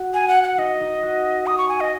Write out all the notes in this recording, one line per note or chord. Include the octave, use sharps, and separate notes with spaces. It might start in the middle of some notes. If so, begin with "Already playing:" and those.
Already playing: F#4
G#5
F#5
F#5
D#4 D#5
D#4
F#4
D#6
C#6
G#5
D#5